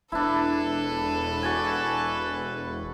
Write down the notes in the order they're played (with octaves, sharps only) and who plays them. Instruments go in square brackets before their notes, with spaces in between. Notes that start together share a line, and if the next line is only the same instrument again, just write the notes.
[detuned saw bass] E1 [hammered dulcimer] D4 E4 [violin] A4 B4
[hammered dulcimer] F#4 D5 G#5